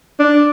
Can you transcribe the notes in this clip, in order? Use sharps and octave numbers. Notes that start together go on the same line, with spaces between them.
D4